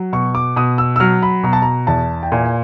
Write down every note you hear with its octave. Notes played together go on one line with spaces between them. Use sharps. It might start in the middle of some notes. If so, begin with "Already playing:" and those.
Already playing: F#3
B2 C#6
D6
B2 D#6
E6
E6
F#3 F6
B5
B2 A#5
A5
A#5
E2 A5
G5
A#2 G#5